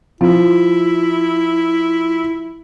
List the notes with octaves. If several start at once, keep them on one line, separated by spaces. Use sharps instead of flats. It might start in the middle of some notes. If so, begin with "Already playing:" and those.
F3 E4